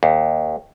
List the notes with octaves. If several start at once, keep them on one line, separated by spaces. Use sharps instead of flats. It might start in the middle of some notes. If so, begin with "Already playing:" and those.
D#2